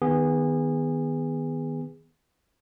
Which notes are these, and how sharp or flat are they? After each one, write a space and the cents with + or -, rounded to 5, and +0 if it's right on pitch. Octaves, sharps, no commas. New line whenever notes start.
D#3 +5 B3 +0 G#4 -25